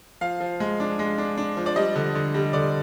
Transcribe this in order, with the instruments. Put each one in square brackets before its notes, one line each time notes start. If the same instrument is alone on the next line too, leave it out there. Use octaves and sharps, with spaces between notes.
[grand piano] F3 F5
F3
G#3
D4
G#3
D4
D4
F3
D5
G3 D#5
D3
D3
G3
D3 D5